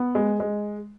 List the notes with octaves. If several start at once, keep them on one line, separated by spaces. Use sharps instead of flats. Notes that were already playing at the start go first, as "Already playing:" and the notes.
Already playing: B3
G#3
G#3